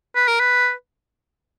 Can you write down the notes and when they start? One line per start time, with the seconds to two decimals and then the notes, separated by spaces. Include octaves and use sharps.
0.15 B4
0.28 A#4
0.40 B4